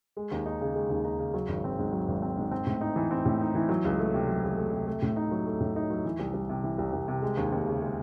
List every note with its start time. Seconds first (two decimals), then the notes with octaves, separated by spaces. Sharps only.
0.17 G#3
0.31 D#2
0.46 D#4
0.61 C#3
0.75 G#3
0.90 D#2
1.05 D#4
1.20 C#3
1.34 F#3
1.49 G#1
1.64 C4
1.78 G#2
1.92 F#3
2.08 G#1
2.22 C4
2.37 G#2
2.51 C4
2.67 A2
2.81 D#4
2.96 E3
3.11 C4
3.25 A2
3.41 D#4
3.55 E3
3.69 F#3
3.85 C#2
3.99 A3
4.14 C3
4.28 F#3
4.43 C#2
4.57 A3
4.73 C3
4.87 A3
5.02 A2
5.16 D#4
5.31 F#3
5.46 A3
5.60 A2
5.76 D#4
5.90 F#3
6.05 E3
6.20 C2
6.34 C2
6.49 C3
6.63 E3
6.78 C2
6.93 C2
7.08 C3
7.22 G#3
7.37 D#2
7.52 D#2
7.67 C#3
7.82 G#3